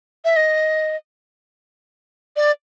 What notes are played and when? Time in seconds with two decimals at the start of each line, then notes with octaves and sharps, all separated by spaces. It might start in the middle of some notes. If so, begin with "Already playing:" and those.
0.25 E5
0.36 D#5
2.36 D5